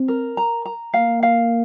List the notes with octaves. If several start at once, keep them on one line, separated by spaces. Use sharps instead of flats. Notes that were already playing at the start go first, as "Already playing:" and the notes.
Already playing: C4
A#4
A#5
A#5
A#3 F5
F5